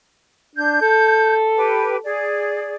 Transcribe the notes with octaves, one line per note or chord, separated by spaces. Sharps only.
D4 G6
A4
G4 B4
G#4 D5